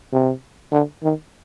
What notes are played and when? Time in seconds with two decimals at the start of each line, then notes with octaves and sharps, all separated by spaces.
0.13 C3
0.72 D3
1.03 D#3